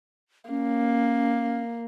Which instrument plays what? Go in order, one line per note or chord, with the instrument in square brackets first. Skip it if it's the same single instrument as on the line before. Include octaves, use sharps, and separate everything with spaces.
[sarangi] A#3 [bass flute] C#4